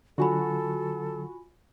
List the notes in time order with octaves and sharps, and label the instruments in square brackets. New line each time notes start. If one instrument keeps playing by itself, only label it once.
[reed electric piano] D3 F#3 [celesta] F4 G#5 B5 [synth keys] F#4 [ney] A4